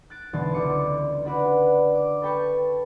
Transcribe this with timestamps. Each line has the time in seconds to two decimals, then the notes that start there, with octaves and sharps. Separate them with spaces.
0.10 F#6 A6 D7
0.33 E1 B2 D3 E3 C6 A6
0.53 C#2 D3 D6 C#7 D#7
1.25 D4 F#4 B4 D5
1.95 D6
2.22 A4 B4 G5 A5 C#6 G6